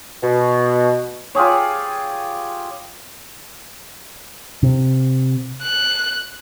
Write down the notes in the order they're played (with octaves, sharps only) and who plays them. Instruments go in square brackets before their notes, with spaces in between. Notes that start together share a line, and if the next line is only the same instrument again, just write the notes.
[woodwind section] B2
[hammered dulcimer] F4 G4 G#4 C#5
[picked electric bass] C3
[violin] F#6